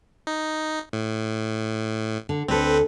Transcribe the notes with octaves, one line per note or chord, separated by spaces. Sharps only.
D#4
A2
D3
D2 C4 A4 B4